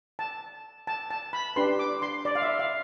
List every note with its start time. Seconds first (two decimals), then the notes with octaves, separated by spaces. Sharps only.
0.19 A5
0.87 A5
1.11 A5
1.33 B5
1.56 D4 G4 B4 C6
1.79 D6
2.02 C6
2.25 D5
2.35 F5
2.42 E5
2.59 F5